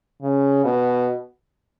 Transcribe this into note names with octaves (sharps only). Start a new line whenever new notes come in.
C#3
B2